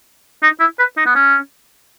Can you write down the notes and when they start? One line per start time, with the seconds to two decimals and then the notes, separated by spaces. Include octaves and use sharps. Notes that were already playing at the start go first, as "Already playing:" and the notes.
0.43 D#4
0.60 E4
0.79 B4
0.97 D#4
1.06 B3
1.15 C#4